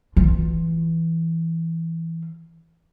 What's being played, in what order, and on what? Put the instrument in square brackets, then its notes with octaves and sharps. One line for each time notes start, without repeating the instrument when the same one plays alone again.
[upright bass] E3 F4